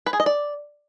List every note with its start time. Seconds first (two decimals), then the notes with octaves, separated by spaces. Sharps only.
0.06 B4
0.13 G#4
0.20 D#5
0.26 D5